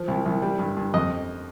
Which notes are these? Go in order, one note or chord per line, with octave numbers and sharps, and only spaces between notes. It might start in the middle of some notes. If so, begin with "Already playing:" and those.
Already playing: F3
C2
C2
G3
G2
G2
F2 D#5